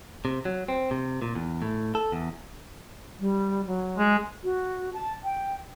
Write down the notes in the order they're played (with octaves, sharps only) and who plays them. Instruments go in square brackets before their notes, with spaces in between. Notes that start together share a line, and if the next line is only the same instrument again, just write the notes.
[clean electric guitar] C3
F#3
C4
C3
A#2
E2
A2
A4
E2
[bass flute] G3
F#3
[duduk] G#3
[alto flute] F#4
A5
G5